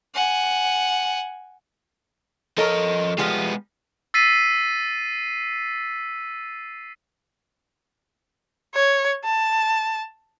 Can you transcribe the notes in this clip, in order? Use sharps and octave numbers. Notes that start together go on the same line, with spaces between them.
F#5 G#5
F3 A4 A#4 C#5 D#5
F3 G3 G#3 B3 G#4
E6 A6 B6 C7 D#7
C#5
A5